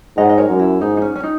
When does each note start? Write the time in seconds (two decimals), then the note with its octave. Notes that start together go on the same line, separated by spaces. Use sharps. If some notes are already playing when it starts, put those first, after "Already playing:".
0.17 G#2 D#5 F#5
0.29 D#5
0.38 A#4 C#5
0.49 F#2
0.59 E4
0.81 G#2 D#4
0.97 D#4
1.02 C#4
1.16 C#4
1.24 D#4